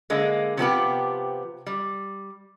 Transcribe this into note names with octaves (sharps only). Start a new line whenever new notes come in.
D3 G#3 A#3
C3 F3 B3 G4
G3